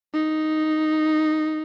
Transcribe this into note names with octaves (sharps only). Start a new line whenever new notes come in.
D#4